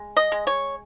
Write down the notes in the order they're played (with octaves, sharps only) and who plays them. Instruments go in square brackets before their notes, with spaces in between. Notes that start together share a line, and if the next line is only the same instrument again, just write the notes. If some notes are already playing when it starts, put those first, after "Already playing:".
Already playing: [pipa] G#3
D#5
G#3
C#5